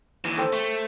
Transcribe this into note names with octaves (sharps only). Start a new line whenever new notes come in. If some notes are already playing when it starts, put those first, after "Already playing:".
D#2 E3
A4 C5 G5
A3